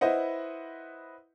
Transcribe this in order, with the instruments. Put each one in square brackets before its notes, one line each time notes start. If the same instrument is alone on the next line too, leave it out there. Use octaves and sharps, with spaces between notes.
[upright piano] E4 B4 C5 D#5 F#5